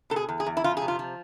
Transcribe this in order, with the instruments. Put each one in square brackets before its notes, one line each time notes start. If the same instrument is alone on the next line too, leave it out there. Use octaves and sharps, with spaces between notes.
[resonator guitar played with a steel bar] B2 A4
G#4
E2
G#4
E2
E4
F2 F4
C3 G#4
F4
F3